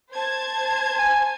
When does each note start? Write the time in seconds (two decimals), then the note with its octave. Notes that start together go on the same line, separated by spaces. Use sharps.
0.12 C5 A5 G#6
0.99 G#5